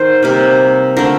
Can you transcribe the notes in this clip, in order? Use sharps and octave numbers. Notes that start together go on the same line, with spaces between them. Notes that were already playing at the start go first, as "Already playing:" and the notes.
Already playing: D#3 A#4 C5
C3 G3 A#3
D3 F3 A3 A#4